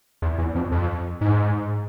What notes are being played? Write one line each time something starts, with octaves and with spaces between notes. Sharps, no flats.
E2
E2
F2
F2
G#2